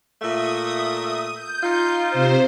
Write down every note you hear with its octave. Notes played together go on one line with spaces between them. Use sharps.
A#2 A3 E5 D#6
G6
D#4 F4
C3 C5